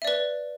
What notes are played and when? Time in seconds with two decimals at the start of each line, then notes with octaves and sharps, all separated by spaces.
0.02 E5
0.05 D5
0.07 B4